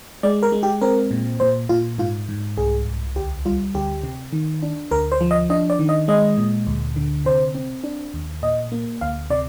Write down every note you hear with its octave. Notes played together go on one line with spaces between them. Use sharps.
G#3 D5
A#4
G#3
G4
C4 A#4
A#2
A#2 C5
A#2 F4
G#2 F4
G#2
C2 G#4
C2
D2 G4
G3 F4
D2 G4
C3
D#3
D4
D2 A#4
C5
F3
D#5
D4 D#5
D5
D#3
D#5
G#3 D#5
A#2
D2
D3
C3 C5
C4
D4
D#2
A#2 D#5
A#3
D2 F5
C3 D5